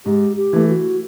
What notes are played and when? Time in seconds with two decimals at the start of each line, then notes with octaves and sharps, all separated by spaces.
0.06 G#2 G4
0.36 G4
0.53 E3 A3
0.69 F#4